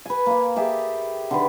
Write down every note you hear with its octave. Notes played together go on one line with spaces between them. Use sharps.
B4 G#5
A#3 F5
G4 G#4 E5 A5
D3 D#3 B4